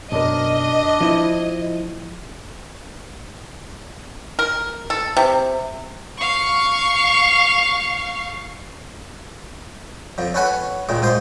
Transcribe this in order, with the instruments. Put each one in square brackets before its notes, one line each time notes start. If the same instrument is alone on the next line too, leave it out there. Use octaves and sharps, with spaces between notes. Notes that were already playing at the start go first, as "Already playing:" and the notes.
[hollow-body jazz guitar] B1 F#2 A#4 [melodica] D4 [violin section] D#5
[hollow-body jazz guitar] F3 E4
[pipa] A#4
A4
C3
[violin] F5 C#6
[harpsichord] F2 F3
C#4 A4 B4 C#5 F#5 G#5
C#2 A#2 D#3 G#3
G#2 F4 C5 C6